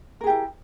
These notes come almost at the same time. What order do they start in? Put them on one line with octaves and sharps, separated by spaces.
A#4 G#4 G4 E4